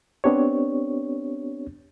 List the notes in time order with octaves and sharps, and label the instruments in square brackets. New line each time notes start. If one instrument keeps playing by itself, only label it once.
[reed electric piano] B3 C4 D4 G4 C#5